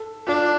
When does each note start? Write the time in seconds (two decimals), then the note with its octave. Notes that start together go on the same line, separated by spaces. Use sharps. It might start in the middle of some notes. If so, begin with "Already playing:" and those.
Already playing: A4
0.27 D4 F4